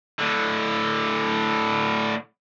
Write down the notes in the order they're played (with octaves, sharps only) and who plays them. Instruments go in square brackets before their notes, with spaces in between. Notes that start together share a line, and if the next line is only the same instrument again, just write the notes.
[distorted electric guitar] A2 D3